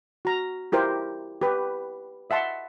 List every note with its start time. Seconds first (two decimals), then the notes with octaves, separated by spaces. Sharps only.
0.25 F#4 A#5
0.72 E4 G4 A#4 C5
1.41 G4 B4
2.30 D#5 E5 F#5 A5 C6